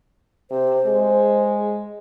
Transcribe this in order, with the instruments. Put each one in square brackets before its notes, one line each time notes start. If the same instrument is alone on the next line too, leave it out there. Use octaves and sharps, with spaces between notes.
[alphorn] C3 [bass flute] C5
[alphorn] G#3